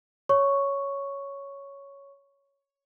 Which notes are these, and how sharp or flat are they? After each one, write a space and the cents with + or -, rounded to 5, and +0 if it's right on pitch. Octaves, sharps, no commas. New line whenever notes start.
C#5 +5 C#6 +0